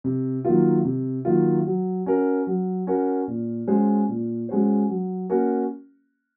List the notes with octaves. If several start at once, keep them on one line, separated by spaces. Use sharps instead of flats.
C3
D#3 F#3 A#3 F4
C3
D#3 F#3 A#3 F4
F#3
C#4 F#4 A#4
F#3
C#4 F#4 A#4
A#2
G#3 C#4 F#4 C5
A#2
G#3 C#4 F#4 C5
F#3
A#3 C#4 F#4 A#4